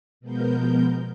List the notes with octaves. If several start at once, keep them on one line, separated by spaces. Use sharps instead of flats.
B2 F3 G#3 B3 A#4 G6